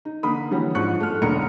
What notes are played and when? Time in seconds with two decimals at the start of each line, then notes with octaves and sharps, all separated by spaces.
0.05 D#4
0.23 D3 A#3 B5 D#6
0.51 D3 E3 G3 C#4 F#4
0.75 G#2 F3 D4 C#6 F#6 C#7
1.00 A3 F6
1.22 E1 B1 D3 A#4 C#7